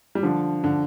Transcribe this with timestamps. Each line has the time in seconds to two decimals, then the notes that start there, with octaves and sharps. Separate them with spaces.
0.15 G3
0.23 D3 F3
0.64 D3